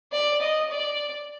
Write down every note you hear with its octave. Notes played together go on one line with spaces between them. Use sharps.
D5
D#5
D5